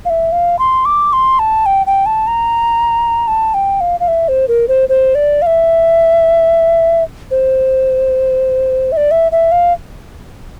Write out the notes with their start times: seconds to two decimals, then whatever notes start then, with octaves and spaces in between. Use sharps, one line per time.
0.05 F5
0.10 E5
0.32 F5
0.59 C6
0.85 D6
1.13 C6
1.39 A5
1.66 G5
1.86 G5
2.06 A5
2.27 A#5
3.28 A5
3.54 G5
3.81 F5
4.00 F5
4.08 E5
4.28 C5
4.48 A#4
4.68 C5
4.89 C5
5.15 D5
5.42 F5
5.47 E5
7.31 C5
8.92 E5
8.97 D5
9.11 E5
9.32 E5
9.52 F5